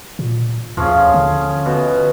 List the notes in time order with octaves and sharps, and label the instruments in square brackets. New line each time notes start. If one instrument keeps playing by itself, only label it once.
[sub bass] A#2
[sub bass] D#2 [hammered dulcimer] F3 C#4 G#4
[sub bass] D3
[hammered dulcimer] B2